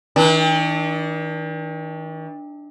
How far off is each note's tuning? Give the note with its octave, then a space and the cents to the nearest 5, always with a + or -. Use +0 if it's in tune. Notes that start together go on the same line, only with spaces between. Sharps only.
D#3 +45 D4 +0